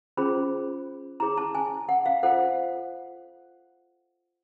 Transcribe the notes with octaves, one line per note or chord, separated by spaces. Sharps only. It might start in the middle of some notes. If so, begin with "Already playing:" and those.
C#4 F4 G#4 C5 B5
E4 G#4 C#5 A#5
A5
G#5
F#5
F5
F4 A4 C5 F#5